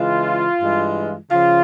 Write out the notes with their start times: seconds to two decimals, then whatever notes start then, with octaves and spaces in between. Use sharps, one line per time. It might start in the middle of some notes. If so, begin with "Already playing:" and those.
Already playing: C#3 E3 G#3 F4
0.61 G2 E3 G#3
1.31 C#3 F3 F4